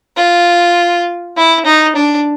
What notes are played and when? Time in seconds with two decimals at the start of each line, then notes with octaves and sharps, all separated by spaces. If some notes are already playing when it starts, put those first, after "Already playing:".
0.17 F4
1.37 E4
1.66 D#4
1.96 D4